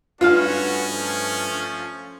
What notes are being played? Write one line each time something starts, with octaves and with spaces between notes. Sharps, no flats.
G2 A3 B3 C#4 F4 F#4 B4 F5
F3 A3